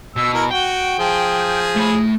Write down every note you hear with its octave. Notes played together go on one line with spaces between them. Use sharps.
B2 E6
E4 A#4
F#4 G5
F3 G#4
A3 B5